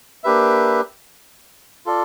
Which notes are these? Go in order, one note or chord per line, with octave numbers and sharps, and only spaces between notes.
A#3 D4 G4 B4 E5
F4 A4 D5